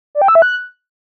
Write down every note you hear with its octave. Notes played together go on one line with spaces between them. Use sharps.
D5
G5
E6
E5
F#6